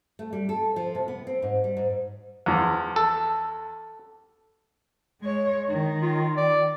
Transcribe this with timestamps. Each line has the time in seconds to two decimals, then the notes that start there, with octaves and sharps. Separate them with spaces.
0.19 A3
0.33 G3
0.49 A4
0.76 F3
0.95 C3
1.08 B3
1.27 C4
1.42 G#2
1.64 G3
1.77 G#2
2.46 E2 F3
2.96 A4
5.21 G#3 C#5
5.68 D#3
6.02 F4
6.37 D5